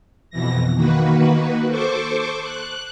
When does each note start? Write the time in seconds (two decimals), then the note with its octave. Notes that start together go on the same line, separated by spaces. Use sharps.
0.30 F2 B2 E3 A#6
0.75 D#3 A#3 F#4 B4
1.69 A4 C5 C#6 D6
2.43 F#6